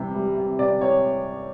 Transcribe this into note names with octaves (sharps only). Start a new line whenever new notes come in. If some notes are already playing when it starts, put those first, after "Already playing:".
Already playing: C3 E3 G3
G3
C3
C3 D5
C3 C#5